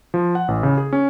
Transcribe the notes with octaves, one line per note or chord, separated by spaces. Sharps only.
F3
F#5
A1
C#3
G#4
C#4